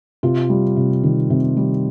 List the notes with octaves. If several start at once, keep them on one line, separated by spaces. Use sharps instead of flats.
C3 F4
G3
C3
D#3
C3
G3